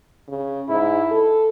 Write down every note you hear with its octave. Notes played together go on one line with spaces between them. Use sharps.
C#3
G#2 E4
A4